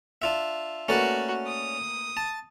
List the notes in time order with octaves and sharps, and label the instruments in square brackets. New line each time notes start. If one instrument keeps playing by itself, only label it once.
[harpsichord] D4 F4 E5
[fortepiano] A3 A#3 B4 [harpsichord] C#4 D5 [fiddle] F#4
[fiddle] D#6
[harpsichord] A5